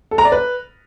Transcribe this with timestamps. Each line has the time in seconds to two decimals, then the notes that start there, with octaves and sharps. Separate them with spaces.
0.11 A4
0.18 A#5
0.25 D5
0.32 B4